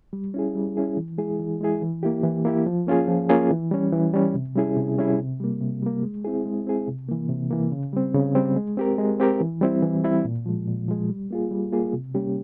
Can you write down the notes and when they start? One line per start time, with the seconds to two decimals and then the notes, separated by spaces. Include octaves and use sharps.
0.13 G3
0.34 C#4 E4 G#4
0.55 G3
0.77 C#4 E4 G#4
0.97 E3
1.18 G#3 E4 G#4
1.39 E3
1.61 G#3 E4 G#4
1.82 E3
2.03 A#3 E4 G4
2.24 E3
2.45 A#3 E4 G4
2.66 F3
2.87 A#3 C#4 F4 G#4
3.08 F3
3.29 A#3 C#4 F4 G#4
3.51 E3
3.71 G3 C#4
3.92 E3
4.13 G3 C#4
4.34 C3
4.55 G3 C#4 E4 G#4
4.77 C3
4.98 G3 C#4 E4 G#4
5.20 C3
5.40 G3 A#3
5.61 C3
5.82 G3 A#3
6.03 G#3
6.25 C4 E4 G#4
6.45 G#3
6.67 C4 E4 G#4
6.87 C3
7.09 E3 A#3
7.29 C3
7.51 E3 A#3
7.72 C#3
7.93 G3 C4
8.14 C#3
8.35 G3 C4
8.56 G#3
8.77 C4 G4 A#4
8.98 G#3
9.20 C4 G4 A#4
9.41 E3
9.61 G3 C4 E4
9.83 E3
10.04 G3 C4 E4
10.25 A#2
10.46 F3 G#3
10.67 A#2
10.88 F3 G#3
11.10 G3
11.31 A#3 F4 G#4
11.51 G3
11.72 A#3 F4 G#4
11.93 C3
12.15 G3 A#3 C#4 G4